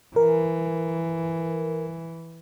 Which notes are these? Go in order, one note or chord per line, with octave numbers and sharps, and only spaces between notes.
E3 A#4